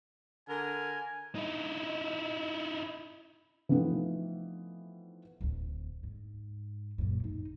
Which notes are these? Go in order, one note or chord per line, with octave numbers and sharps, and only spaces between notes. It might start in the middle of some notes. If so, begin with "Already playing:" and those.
D3 A#4 G#5
D#4 E4
E3 F3 A3 B3 C4 D#4
D1 D2
G#2
F#2 A#2
A1 D#4